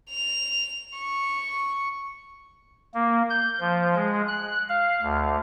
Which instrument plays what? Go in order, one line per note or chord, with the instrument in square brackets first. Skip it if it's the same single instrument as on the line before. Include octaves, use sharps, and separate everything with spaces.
[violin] F7
C#6
[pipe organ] A#3
G6
F3
G#3
F#6
F5
D2